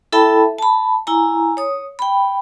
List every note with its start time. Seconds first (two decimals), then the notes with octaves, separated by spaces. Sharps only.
0.12 E4 A4 E5 G5 A5 B5
0.58 A5 B5
1.07 E4 G#5 A#5
1.57 C#5 D#6
1.99 G5 B5